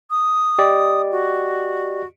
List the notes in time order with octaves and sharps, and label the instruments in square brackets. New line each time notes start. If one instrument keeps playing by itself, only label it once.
[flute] D#6
[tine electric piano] G4 D5 D#5
[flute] F#4